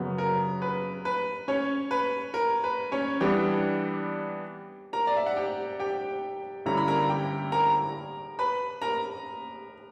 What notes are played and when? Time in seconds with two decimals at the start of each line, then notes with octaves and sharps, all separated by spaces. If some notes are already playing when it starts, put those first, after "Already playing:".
Already playing: F#2 C#3 F#3 B3
0.18 A#4
0.62 B4
1.05 B4
1.48 C#4 C#5
1.91 B4
2.34 A#4
2.64 B4
2.92 C#4 C#5
3.21 E3 G3 B3 D4 G4 G5
4.93 A#4 A#5
5.07 D5
5.16 E5
5.27 F#5
5.37 G4 G5
5.79 G4 G5
6.65 G2 D3 G3 C#4 E4 A#5
6.77 B5
6.88 A#4 A#5
7.09 G4 G5
7.52 A#4 A#5
8.39 B4 B5
8.82 A#4 A#5